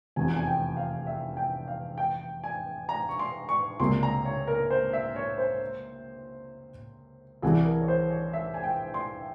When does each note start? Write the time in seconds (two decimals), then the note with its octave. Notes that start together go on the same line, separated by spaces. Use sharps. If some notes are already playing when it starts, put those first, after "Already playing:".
0.16 F1 E2 C3 G#5
0.36 G#5
0.47 G5
0.77 F5
1.07 E5
1.37 G5
1.68 F5
1.98 G5
2.44 G#5
2.89 A#5
3.09 C#6
3.19 C6
3.49 C#6
3.80 C#2 C3 G3 A#3 C6
4.03 A#5
4.25 C#5
4.47 A#4
4.70 C5
4.93 E5
5.16 C#5
5.38 C5
7.42 C2 C3 E3 G3 G#4
7.65 A#4
7.81 C#5
7.88 C5
8.11 C#5
8.33 E5
8.54 G#5
8.64 G5
8.94 C6